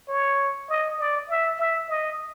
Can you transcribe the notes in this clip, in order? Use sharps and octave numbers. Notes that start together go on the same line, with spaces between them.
C#5
D#5
D5
E5
E5
D#5